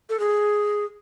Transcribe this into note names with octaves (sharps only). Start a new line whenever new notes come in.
A4
G#4